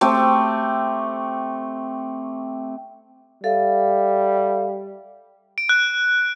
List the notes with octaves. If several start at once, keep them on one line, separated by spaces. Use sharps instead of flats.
A3 C4 G4
G3 A4 E5 F5
D7
F#6